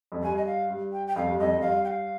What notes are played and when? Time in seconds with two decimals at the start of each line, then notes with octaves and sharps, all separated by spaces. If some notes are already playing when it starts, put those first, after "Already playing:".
0.12 F2
0.22 G2 G#5
0.37 D#5
0.46 F5
0.69 G2
0.92 G5
1.07 G5
1.16 F2 F5
1.27 G2
1.38 F2 D#5
1.56 F2
1.61 G2 F5
1.84 G5
1.88 F5